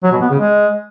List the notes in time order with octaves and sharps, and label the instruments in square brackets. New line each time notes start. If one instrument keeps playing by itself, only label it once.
[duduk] F#3
B2
B3
C#3
G#3